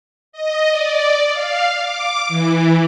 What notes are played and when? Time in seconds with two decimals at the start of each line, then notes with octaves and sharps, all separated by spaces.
0.32 D#5
0.71 D5
1.32 F5
1.79 D6
2.28 E3